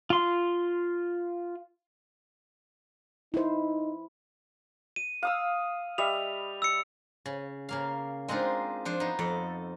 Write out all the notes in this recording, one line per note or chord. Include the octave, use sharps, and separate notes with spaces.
F4 C6
D#4 E4 C5
D#7
F5 D#6 E6
G3 D#5 E5 F7
E6 C#7
C#3
C#3 A#3 F5
G#3 C4 D4 D#4 F4
F3 D4 C5
B3 D#4
F2 A4